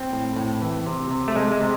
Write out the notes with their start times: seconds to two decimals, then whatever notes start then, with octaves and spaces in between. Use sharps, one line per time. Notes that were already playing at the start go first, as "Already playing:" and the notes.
Already playing: C4
0.13 A2
0.36 A2
0.62 E3
0.86 C3
1.11 C3
1.28 A3
1.36 C3 G#3
1.52 G#3
1.61 C3